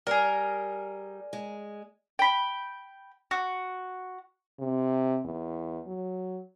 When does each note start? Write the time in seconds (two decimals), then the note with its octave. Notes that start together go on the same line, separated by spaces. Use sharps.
0.07 G3 G#4 A#4
1.33 G#3
2.19 G5 B5
3.31 F#4
4.59 C3
5.25 E2
5.87 F#3